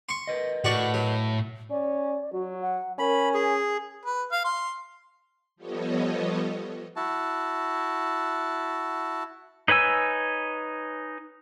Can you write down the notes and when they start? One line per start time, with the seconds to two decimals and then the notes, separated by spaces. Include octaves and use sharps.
0.09 C6 C#6
0.27 A#4 B4 D#5
0.64 A2 F#4 D5 C#6
0.94 F#3
1.70 C#4 D5
2.33 F#3 F#4
2.62 F#5
2.99 C#4 A#4 B5
3.34 G#4
4.06 B4
4.32 F5
4.44 C6
5.56 F3 G3 B3 A4 C#5 D#5
6.96 E4 F#4 A5
9.68 D#4 B4 C#5 G#5 E6